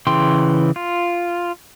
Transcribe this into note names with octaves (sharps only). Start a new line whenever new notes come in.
C#3 E3 G5 C6
F4